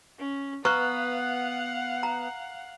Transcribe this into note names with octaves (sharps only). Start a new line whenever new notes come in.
C#4
B3 B4 F5 F#5 A#5 C#6 F#6
A#5